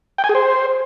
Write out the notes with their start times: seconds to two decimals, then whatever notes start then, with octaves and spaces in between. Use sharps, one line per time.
0.18 G5
0.24 G#5
0.29 G#4
0.35 C5